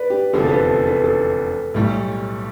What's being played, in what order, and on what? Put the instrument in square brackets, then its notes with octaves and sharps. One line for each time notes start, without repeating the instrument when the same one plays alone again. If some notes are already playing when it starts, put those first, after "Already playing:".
Already playing: [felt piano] B4 D5
G4
[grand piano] F1 E2 D3 F3 [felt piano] A4
[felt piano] A4
B4
A4
B4
A4
[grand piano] B1 A2 G3 [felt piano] G4